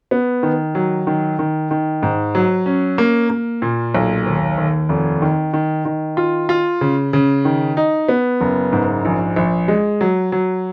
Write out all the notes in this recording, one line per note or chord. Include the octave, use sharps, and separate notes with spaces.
B3
D#3
F#3
D#3
D#3
D#3
G#2
F#3
C#4
A#3
A#3
A#2
B1
D#2
D#2
F1
D#3
D#3
D#3
F4
F4
C#3
C#3
D#3
D#4
B3
F#1
G#2
A#1
A#1
G#3
F#3
F#3